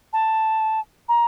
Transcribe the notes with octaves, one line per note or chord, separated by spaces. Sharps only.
A5
A#5